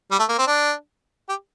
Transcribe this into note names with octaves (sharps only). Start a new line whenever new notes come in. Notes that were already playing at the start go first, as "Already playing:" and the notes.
G3
A3
A#3
C4
D4
G4